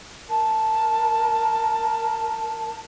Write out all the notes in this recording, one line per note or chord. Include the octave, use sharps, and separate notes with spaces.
A#4 A5